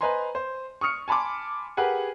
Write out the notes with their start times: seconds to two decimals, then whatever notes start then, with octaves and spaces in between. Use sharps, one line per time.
0.01 B4 C5 D#5 G#5 A#5 C6
0.35 C5
0.81 C#6 D#6 F6 C#7
1.08 G#5 A5 B5 C6 D6
1.77 G4 G#4 A#4 B4 F#5 G#5